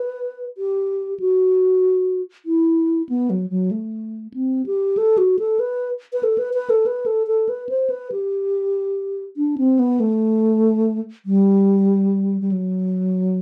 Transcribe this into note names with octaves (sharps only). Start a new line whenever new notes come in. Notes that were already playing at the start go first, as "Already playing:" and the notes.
Already playing: B4
G4
F#4
E4
B3
F#3
F#3
A3
C4
G4
A4
F#4
A4
B4
B4
A4
B4
B4
A4
B4
A4
A4
B4
C5
B4
G4
D4
C4
B3
A3
G3
G3
F#3